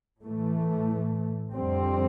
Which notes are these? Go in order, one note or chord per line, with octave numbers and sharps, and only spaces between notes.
A2 E3 A3
F2 D3 G3 C4